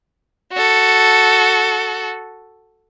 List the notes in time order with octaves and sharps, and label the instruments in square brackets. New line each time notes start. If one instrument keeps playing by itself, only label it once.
[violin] F#4 A4